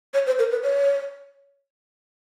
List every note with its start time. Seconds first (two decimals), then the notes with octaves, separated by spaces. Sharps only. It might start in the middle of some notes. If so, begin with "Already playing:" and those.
0.14 C#5
0.27 C5
0.39 A#4
0.51 B4
0.63 C#5